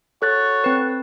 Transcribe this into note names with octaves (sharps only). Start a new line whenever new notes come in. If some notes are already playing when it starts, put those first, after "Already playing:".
F#4 A4 C#5 F#6 A6
C4 B4